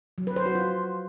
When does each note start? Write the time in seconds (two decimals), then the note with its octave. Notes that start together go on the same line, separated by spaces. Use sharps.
0.18 F#3
0.27 B4
0.36 C5
0.46 F#4
0.55 F4